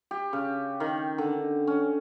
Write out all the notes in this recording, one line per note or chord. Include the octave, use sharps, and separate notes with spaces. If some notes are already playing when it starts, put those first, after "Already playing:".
G4
C#3
D#3
D3
C#4